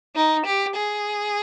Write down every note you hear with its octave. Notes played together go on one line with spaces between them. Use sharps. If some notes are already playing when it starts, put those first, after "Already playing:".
D#4
G4
G#4